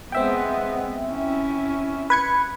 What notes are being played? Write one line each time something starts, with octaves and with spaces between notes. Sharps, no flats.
G#3 B3 C4 E5 G5
C#4 E4
B4 G#6 C#7